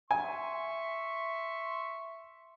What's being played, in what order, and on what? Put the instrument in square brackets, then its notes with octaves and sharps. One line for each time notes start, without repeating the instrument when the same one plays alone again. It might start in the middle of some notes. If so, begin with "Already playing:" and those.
[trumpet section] E5 C6 C#6 [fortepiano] G#5